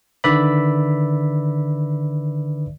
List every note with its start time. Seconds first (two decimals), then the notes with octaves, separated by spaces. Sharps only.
0.24 D3 D#3 B4 D5 E5 B5